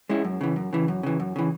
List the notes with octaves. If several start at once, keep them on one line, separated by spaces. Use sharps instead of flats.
G#3 C#4 E4
F#2
C#3 E3
F#2
C#3 E3
F#2
C#3 E3
F#2
C#3 E3